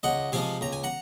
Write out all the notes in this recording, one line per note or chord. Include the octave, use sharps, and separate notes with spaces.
C#2 D#5 F#5
C3 F3 G#3 F5 G#5
C#2 A#5
G#5
F#5 A#5